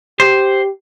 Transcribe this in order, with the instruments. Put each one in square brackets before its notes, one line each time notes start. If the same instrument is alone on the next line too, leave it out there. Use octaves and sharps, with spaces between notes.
[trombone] G4 [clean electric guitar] C5